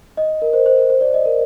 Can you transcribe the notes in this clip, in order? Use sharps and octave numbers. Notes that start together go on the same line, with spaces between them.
D#5
A#4
C5
C5
A#4
C5
D5
D#5
A#4